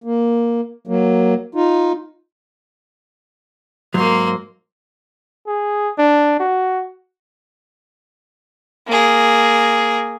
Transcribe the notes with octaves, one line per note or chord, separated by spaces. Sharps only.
A#3
F#3 A#3
D#4 F4
G#2 F#3 A#3 C6
G#4
D4
F#4
A#3 G#4